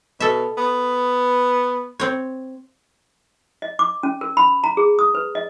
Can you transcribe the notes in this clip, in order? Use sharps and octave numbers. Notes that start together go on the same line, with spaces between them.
B2 A4 E5
B3
C4 C#5
D#5
D6
C#4
A#4
B5
A#5
G#4
D#6
B4
D#5